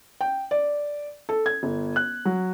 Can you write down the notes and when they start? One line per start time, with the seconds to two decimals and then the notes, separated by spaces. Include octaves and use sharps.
0.21 G5
0.51 D5
1.29 A4
1.46 G#6
1.63 G1
1.96 F#6
2.25 F#3